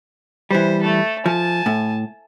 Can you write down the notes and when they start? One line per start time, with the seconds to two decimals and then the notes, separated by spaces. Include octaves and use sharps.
0.51 E3 G3 C5
0.83 A3 A4
1.26 F3 G#5 A5
1.66 A2